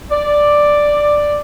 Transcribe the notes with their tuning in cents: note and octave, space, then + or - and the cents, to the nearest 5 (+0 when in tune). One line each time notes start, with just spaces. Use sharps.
D5 +5